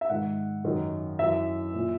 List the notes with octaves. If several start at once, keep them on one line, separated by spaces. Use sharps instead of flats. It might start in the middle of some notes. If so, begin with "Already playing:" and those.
E5
G#2 D#3 F#5
F#2 D#3
F#2 E3 E5
A#2